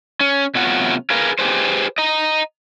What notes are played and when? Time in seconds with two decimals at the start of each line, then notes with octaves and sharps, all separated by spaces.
0.21 C#4
0.55 C3 F#3 A3 B3 F4 F#5
1.10 G#4 A#4 B4 F5
1.39 G4 G#4 B4 C5
1.98 D#5 A#5